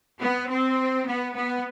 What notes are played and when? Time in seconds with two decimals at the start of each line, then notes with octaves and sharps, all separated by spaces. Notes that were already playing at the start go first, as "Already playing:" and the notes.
0.21 B3
0.50 C4
1.06 B3
1.35 B3